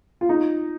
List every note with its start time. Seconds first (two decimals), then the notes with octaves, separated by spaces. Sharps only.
0.21 F4
0.29 D#4